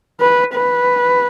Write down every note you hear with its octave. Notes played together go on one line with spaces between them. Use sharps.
B4
B4